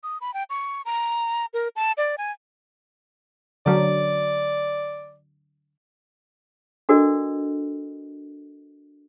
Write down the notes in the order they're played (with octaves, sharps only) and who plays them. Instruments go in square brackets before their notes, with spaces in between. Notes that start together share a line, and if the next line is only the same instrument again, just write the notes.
[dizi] D#6
B5
G5
C#6
A#5
A#4
A5
D5
G#5
[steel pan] D3 F#3 [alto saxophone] D5
[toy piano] D4 F#4 A4 A#4 D5 D#5